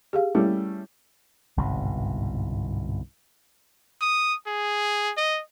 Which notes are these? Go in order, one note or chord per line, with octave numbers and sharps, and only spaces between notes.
G4 G#4 F5
G3 A3 C#4 E4
G1 C2 G#2 B2
D#6
G#4
D#5